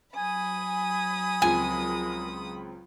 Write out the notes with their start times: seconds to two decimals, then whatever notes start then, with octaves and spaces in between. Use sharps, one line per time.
0.16 F#3 G#5 B5 D#6
1.42 C#2 F3 G#3 C4 A#4 G#5